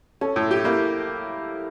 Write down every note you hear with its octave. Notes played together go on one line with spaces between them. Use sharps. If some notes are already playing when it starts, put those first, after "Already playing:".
C#4 A4
A2
G4
A#3 E4